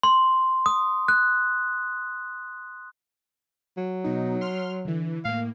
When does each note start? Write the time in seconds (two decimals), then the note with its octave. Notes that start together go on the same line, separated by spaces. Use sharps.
0.03 C6
0.66 D#6
1.08 F#6
3.77 F#3
4.04 B2 D#4
4.41 C6 F6
4.85 D3 E3
5.25 A2 A#3 F5